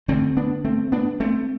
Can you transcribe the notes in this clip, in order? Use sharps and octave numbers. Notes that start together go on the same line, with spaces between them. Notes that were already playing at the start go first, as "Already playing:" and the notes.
D2 D3 A3 C4
B3 D4
A3 C4
B3 D4
A3 C4